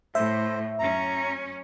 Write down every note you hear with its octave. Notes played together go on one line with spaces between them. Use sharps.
A2 C5 E5
F#2 C#4 A#5